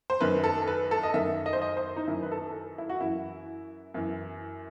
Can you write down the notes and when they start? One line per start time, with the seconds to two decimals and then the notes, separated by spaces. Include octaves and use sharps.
0.10 C5
0.21 F#2 D#3 B4
0.44 A4
0.67 B4
0.91 A4
1.03 D#5
1.14 F#2 D#3 E5
1.46 D#5
1.53 C5
1.62 D#5
1.77 C5
1.96 D#4
2.08 F#2 D#3 E4
2.22 B4
2.31 A4
2.78 E4
2.89 F#4
3.01 F#2 E3 E4
3.94 F#2 E3